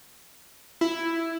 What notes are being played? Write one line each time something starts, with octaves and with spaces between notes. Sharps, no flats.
E4